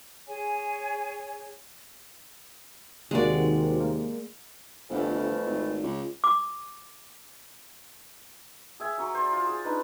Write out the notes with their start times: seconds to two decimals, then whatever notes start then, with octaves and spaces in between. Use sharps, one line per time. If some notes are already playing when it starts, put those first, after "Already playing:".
0.27 G#4 C#5 G#5
3.11 D#2 C3 D#3 G#3 A#3 F#4 D5
3.80 A#3
4.90 G1 F2 E3 A3
5.46 G#1
5.83 C#2
6.24 D6
8.80 G#4 E5 G#5
8.98 F#3 C#4 A#5 C#6
9.14 C5 D5
9.33 F4
9.46 G#4
9.64 D4 D#4 B4